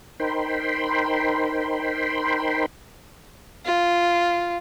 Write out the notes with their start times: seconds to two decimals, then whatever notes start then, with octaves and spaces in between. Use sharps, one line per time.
0.20 D#4 A#4 C5 G5 B5 C6
3.65 F4